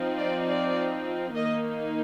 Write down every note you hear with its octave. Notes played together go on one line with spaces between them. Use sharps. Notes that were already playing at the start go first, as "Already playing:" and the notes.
Already playing: F3 C4 D#4
D5
D5
D#3 A#3 D#4 D#5